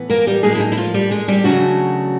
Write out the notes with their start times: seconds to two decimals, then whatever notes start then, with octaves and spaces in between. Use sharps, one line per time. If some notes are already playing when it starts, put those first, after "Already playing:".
Already playing: A2 E3 B3
0.10 A#3 A#4
0.27 G3 G4
0.43 A2 F#3 G#3 A#3 D#4 G#4
0.55 E4
0.60 D#4
0.72 E4
0.77 F3 F4
0.94 G3 G4
1.11 G#3 G#4
1.28 G3 G4
1.44 C#3 E3 F#3 A3 D4 F#4